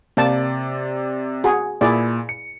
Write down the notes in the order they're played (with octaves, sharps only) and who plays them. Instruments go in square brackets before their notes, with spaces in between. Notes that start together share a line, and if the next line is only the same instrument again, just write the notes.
[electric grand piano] C3 D5 [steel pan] A#3 A5
[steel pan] F#4 G#4
[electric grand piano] A#2 [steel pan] E4 G#4 D5
[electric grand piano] C#7